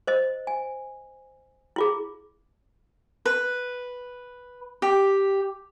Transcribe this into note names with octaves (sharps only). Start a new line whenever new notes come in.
C5 D#5
G#5
E4 F4 G#4
B4
G4